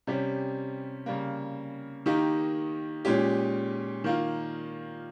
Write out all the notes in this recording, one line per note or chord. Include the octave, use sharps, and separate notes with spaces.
C3 G3 C#4 G4
C#3 G3 A#3
D#3 A#3 D#4 G4
A#2 G#3 C#4 G4
D#3 A#3 F4